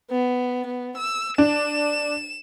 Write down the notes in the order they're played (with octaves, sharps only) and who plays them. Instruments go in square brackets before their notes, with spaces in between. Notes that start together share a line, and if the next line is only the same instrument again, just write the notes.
[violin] B3
B3
E6
[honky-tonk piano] D4 [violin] E7